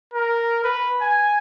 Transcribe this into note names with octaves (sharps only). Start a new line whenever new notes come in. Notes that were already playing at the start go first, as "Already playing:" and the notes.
A#4
B4
G#5